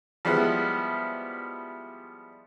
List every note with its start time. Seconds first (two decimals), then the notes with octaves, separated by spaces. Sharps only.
0.25 F3 G3 G#3 B3 E4